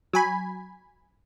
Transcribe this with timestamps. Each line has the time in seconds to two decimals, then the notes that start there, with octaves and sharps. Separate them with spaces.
0.13 F#3 G#5 B5